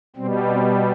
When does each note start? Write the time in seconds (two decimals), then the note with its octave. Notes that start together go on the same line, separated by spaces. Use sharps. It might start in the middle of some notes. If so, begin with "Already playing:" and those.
0.16 B2 G3 C4
0.50 C4